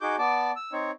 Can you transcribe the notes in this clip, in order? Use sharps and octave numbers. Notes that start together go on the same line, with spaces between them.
D#4 F#4 G#4 D6 G6
B3 D5 A5 D6
E6
C4 D#4 C#5